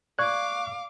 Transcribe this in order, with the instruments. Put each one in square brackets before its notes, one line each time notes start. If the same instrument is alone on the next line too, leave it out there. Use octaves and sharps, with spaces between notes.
[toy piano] D5 [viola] F5 D6 [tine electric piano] C#6 F#6